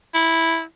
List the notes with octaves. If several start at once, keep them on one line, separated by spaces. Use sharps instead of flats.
E4